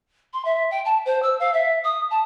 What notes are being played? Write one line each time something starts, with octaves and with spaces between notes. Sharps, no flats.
C6
E5
G5
A5
C5
E6
F5
E5
D#6
A5